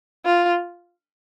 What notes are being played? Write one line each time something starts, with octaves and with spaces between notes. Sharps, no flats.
F4